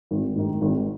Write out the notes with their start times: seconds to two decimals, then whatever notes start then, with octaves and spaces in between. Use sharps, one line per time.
0.11 G#1
0.36 G#2 D#3
0.61 G#1